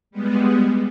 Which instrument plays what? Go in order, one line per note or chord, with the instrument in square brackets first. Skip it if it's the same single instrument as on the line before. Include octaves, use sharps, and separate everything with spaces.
[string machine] G3 G#3 B3